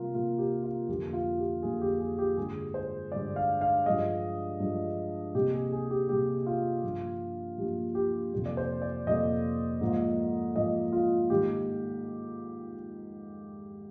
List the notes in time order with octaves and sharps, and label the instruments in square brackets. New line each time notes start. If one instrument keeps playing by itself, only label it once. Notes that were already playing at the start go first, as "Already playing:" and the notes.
Already playing: [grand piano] C3 G3 A#3 F4 A#4
C3 G3 A#3 F4
G4
F4
F2 D3 G3 A#3 G4
F4
G4
F2 D3 G3 A#3 G#4
G4
G#4
G4
G2 D3 G#3 G#4
C5
G2 D3 G#3 D5
F5
F5
G2 F3 G#3 D#5
G2 F3 G#3
C3 G3 A#3 G4
G#4
G#4
G4
C3 G3 A#3 G4
F4
G2 F3 A#3
G2 F3 A#3 G4
G4
F2 C3 G3 A#3
D5
C5
D5
F2 C3 G3 A#3 D#5
G#2 F3 A#3
G#2 F3 A#3 D#5
F4
G#2 D#3 G3 A#3 G4